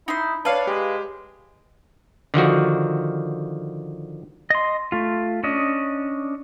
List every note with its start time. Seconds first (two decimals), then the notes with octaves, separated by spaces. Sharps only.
0.08 D#4 E4 C6
0.45 D4 B4 C#5 F5 A5
0.67 G#3 G4
2.34 D3 D#3 F3 F#4
4.50 D#5 C6
4.92 A3 F4
5.44 C#4 D4 D#5